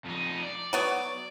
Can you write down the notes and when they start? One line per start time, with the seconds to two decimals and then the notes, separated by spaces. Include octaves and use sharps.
0.05 F2 D#4
0.42 D5
0.73 F#3 B3 C#5